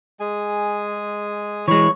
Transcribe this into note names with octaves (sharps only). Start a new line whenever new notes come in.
G#3 G#4 G#5
E3 G#3 C#5 C#6